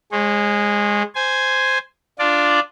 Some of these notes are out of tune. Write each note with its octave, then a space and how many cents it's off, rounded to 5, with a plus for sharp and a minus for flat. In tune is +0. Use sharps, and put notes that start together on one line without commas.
G#3 -10 C#5 -45
C5 -5 G#5 +0
D4 +0 F4 +0 D5 +0